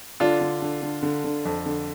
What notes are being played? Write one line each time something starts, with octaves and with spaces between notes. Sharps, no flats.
D3 D4 F4
D3
D3
D3
D3
D3
F2
D3